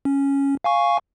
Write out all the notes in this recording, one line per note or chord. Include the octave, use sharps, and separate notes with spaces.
C#4
F5 G#5 C#6